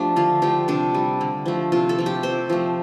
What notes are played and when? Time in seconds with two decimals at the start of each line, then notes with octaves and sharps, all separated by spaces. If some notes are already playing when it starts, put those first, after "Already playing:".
Already playing: F3 A3 D4 G4
0.16 D3 F4
0.42 F3 A3 G4
0.68 C3 D4
0.94 G3
1.21 D3
1.46 F3 A3
1.72 C3 F4
1.89 A4
1.98 F3 A3
2.06 G4
2.23 C3 C5
2.50 F3 A3